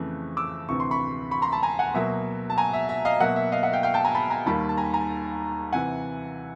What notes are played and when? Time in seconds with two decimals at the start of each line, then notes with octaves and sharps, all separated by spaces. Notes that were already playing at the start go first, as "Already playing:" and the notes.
Already playing: F2 C#3 E3 A3
0.37 D6 E6
0.68 D2 C3 E3 C#6
0.80 C6
0.91 B5 C#6
1.31 B5 C#6
1.42 A#5 C6
1.52 A5 B5
1.63 G#5 A#5
1.79 F#5 G#5
1.94 B2 F#3 A#3 E5
2.50 A5
2.58 G#5 A#5
2.73 E5
2.89 E5
3.05 D#5 F5
3.20 B2 F#3 A#3 E5 F#5
3.36 E5
3.52 D#5 F5
3.63 E5 F#5
3.73 F5 G5
3.83 F5 G5
3.94 G5 A5
4.05 G#5 A#5
4.15 A5 B5
4.30 G#5 A#5
4.46 D#2 D#3 G3 A#3 A5 B5
4.69 A5
4.77 G#5 A#5
4.94 G#5 A#5
5.72 C3 E3 F#5 G#5